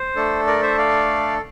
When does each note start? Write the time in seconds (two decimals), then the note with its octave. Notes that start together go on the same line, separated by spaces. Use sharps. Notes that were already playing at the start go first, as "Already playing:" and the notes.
Already playing: C5
0.16 A3 D4 A4
0.47 A#4 D5
0.62 C5 E5
0.78 D5 F5